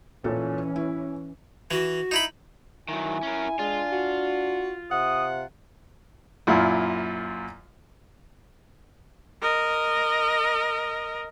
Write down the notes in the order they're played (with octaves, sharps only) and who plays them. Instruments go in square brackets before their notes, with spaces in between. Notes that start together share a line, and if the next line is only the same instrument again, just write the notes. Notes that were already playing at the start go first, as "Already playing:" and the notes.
[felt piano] A#2 A4 [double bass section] E3 C#4
[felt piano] E4
[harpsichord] E3 [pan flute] F#4
[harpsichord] D#4 E4 B5
[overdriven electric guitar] D#3 F#3 [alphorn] E4 [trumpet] G#5
[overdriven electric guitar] C#4 A#4
[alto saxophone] G#3 [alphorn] D4 [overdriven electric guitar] F4
[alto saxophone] F#4
[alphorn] C3 [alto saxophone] F#5 [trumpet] D#6
[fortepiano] F#2 A#2 E4 F4
[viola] A#4 D#5